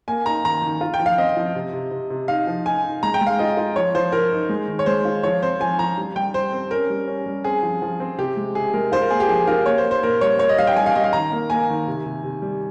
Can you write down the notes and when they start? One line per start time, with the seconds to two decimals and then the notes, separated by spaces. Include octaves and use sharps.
0.08 A#3 G#5
0.26 D#4 A#5
0.44 D#3 A#5
0.62 D#3
0.81 F4
0.94 G5
1.00 F3
1.06 F5
1.18 C4 D#5
1.37 F3
1.55 C3
1.73 C3
1.91 C3
2.10 C3
2.28 D#4 F5
2.47 F3
2.66 D#4 G#5
2.84 D#4
3.03 G#3 A#5
3.14 G5
3.21 G#3
3.27 F5
3.39 F4 D#5
3.57 F4
3.76 F3 C#5
3.95 F3 C5
4.12 F3 A#4
4.32 D#4
4.49 G#3
4.68 D#3
4.79 C#5
4.86 G#3 C5
5.05 F4
5.23 F3 C#5
5.42 C4 C5
5.60 F3 G#5
5.79 F3 A#5
5.97 G3
6.16 G3 G5
6.34 G3 C5
6.52 C4
6.71 C#4 A#4
6.90 G3
7.08 C#4
7.26 G3
7.44 C4 G#4
7.63 F3
7.82 F3
8.00 C4
8.18 C3 G4
8.37 G#3
8.55 C3 G#4
8.73 G#3 A#4
8.92 F4 C5
9.02 A#4
9.11 A#3 G#4
9.20 G4
9.29 F3 G#4
9.47 F4 A#4
9.66 A#3 C#5
9.78 C5
9.85 A#3
9.91 C5
10.03 A#2 A#4
10.21 G3 C#5
10.39 A#3 C#5
10.49 D#5
10.58 G3 F5
10.67 G5
10.76 G3 G#5
10.86 F5
10.95 G3 D#5
11.04 F5
11.13 D#3 A#5
11.32 A#3
11.50 A#3 G#5
11.69 D#3
11.87 C3
12.05 C3
12.24 C3
12.42 G3